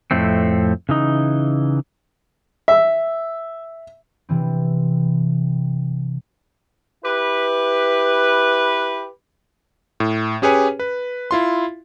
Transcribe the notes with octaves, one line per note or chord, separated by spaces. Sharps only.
F2 A2 A3 C4
C#3 E3 D#4
E5
C3 E3 C4
E4 G4 B4
A2
C#4 G4 G#4 B4 C#5 G#5
B4
E4 F4 C6